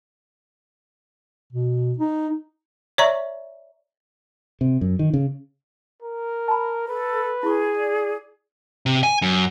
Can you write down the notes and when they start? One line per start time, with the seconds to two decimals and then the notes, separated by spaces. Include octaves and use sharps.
1.53 B2
1.98 D#4
2.98 C#5 D5 E5 A#5 C#6
4.61 C3
4.81 F#2
4.99 D#3
5.14 C#3
6.03 A#4
6.48 A5 B5
6.88 A4 B4
7.43 E4 G#4 C#6
7.77 D5
8.86 C3
9.03 G#5
9.22 F#2